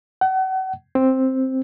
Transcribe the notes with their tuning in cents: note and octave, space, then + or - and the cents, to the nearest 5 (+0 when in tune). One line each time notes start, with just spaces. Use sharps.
F#5 +40
C4 +5